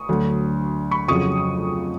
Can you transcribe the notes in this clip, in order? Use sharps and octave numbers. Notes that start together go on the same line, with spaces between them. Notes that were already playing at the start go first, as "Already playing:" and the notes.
Already playing: C#6 D#6
D2 D3 F#3
B5 C#6
F2 C#3 F#3 C#6 D#6